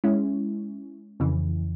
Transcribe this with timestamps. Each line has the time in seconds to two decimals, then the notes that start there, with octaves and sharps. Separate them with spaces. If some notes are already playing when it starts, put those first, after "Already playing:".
0.04 G#3 C#4 E4
1.20 F2 C#3 E3